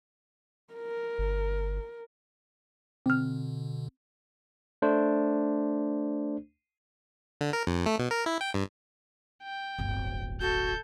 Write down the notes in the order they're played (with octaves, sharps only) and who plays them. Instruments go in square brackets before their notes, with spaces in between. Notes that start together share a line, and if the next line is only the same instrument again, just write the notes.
[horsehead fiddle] A#4
[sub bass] G1
[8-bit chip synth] B2 D3 [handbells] C4 F6
[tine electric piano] A3 D4 C5
[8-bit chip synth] D3
A#4
F2
A3
B2
A#4
E4
G5
G2
[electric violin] G5
[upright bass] D1 G1
[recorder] F#4 [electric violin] A4 G6